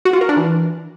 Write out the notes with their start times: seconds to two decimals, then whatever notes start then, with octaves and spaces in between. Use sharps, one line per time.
0.05 F#4
0.13 F4
0.21 A#4
0.29 D4
0.37 E3